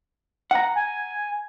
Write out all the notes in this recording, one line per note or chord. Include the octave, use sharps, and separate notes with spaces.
F#5 A#5
G#5